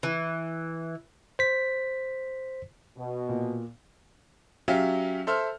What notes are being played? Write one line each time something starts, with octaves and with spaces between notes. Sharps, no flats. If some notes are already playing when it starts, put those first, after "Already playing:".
E3
C5 B6
B2
A#2
F#3 C#4 G4 E5 F5
A4 C5 E5 C6 F6